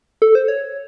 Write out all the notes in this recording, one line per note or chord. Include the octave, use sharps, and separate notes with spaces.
A4
C5
C#5